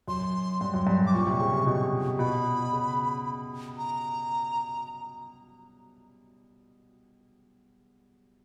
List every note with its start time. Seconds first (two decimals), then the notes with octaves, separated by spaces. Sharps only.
0.08 F#2 C6
0.61 G2
0.74 F#2
0.87 G2
1.07 D6
1.14 A#2 C#6
1.27 C3
1.40 C#3
1.53 C3
1.66 B2
2.19 B2 B5
2.72 C#3
3.78 A#5